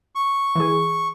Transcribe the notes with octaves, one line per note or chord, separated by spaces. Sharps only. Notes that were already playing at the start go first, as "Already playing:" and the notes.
C#6
E3 G#4